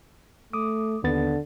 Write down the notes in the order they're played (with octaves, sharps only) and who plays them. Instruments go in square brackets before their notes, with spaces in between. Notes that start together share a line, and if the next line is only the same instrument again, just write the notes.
[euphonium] A3 [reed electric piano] D6 D#6
[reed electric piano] D#2 B3 A6 [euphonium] D3